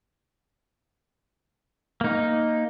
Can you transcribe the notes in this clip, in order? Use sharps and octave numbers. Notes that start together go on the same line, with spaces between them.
A#3 D#4